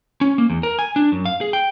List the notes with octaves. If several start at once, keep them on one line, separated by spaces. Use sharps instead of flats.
C#4
A#3
E2
A#4
G#5
D4
F#2
F5
G#4
G5